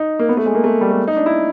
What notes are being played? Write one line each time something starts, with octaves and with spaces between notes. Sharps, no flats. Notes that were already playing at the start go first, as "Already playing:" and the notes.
Already playing: D#4
A#3
B3
A3
G#3
A#3
A3
G3
A3
D#4
D4
E4